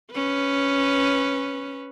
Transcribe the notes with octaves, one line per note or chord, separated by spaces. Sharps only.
C#4 B4